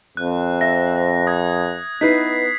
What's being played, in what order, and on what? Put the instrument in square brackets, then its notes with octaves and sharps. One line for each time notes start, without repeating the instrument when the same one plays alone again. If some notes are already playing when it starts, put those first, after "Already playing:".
[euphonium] F2 [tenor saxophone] C4 [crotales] F#6
[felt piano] E5 [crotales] A#6
[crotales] D#6 G#6 A#6
[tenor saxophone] B3 [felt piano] D#4 E4 B4 [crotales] B6 C7